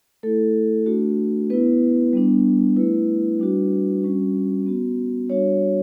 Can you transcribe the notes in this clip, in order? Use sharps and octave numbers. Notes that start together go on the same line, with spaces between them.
A3 E4 A4
A3 D4 F#4
B3 E4 B4
G3 B3 D4
A3 E4 B4
G3 D4 F#4
G3 C#4 F#4
B3 F#4
G3 D4 F#4 C#5